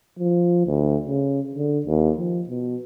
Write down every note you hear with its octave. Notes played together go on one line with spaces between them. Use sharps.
F3
D2
C#3
D3
D#2
F3
B2